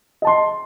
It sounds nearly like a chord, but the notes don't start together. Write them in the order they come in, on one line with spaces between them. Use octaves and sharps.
D#5 A5 C6